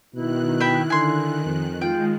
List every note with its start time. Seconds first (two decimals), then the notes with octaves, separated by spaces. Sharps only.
0.15 B2 D#3 E4 F#6
0.60 E5 G5 B5
0.90 D3 G#5 C6
1.45 F2
1.81 G#3 F4 G5